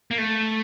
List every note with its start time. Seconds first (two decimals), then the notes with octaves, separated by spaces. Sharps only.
0.11 A#3
0.18 A3